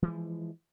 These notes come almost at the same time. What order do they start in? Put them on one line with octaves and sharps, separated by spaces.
E3 G#3 F3